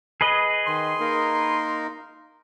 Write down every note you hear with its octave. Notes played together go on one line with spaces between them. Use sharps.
G#4 B4 D#5
D#3 C6
A#3 D#4 A#4